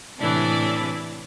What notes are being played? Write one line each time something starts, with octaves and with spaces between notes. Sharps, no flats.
A2 C3 E3 D4 D5